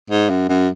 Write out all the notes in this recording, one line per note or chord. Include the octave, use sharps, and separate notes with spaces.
G#2
F#2
F#2